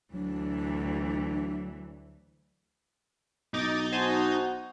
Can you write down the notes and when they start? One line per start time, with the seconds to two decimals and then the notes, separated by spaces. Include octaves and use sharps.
0.14 D2 E3 F#3 D4
3.54 B1 D#4 D#5 D6 A6
3.92 F#4 C5 G#5 A5